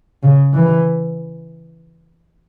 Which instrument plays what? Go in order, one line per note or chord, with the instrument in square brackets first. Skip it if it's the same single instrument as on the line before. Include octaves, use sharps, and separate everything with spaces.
[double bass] C#3
E3